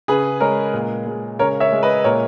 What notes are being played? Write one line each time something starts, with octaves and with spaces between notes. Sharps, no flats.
C#3 G#4 B4
G#3 A#4 C#5
A#2
G#3
C#3 A#4 C#5
C#5 E5
G#3
B4 D#5
A#2 A#4 C#5